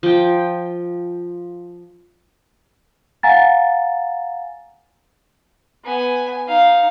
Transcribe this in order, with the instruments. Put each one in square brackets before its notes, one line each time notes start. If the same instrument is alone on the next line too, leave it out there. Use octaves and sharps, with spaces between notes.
[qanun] F3 G5
[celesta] F5 F#5 G#5 A#5 A6
[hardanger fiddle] B3 G#5
D#4 F5